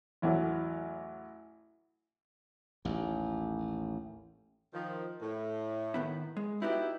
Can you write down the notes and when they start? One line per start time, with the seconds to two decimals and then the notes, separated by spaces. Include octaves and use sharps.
0.22 A1 E2 F#3
2.85 A1 D#2
4.74 D#3 F3
5.22 A2
5.94 D#3 B3 E4
6.37 G#3
6.62 F#3 B3 D#4 E4 F#4 G4